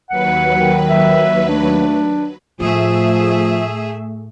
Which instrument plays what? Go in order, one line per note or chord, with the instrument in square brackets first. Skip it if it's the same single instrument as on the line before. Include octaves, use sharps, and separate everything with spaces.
[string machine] D#2 F#3 B4 [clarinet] F#5
[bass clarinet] D#3
[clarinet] E5
[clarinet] A3 [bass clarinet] D4
[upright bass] A2 [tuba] F3 [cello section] A3 G#4 E5